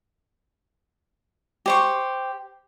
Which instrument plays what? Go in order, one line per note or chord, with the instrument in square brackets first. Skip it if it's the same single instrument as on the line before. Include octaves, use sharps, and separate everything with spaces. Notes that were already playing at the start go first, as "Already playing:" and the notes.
[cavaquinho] G4 C5 C#6